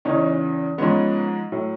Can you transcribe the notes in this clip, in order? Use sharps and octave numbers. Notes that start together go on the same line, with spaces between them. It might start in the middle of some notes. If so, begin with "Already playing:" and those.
E2 C#3 E3 C#4 D#4
G#2 F3 G#3 B3 C#4
A2 F#3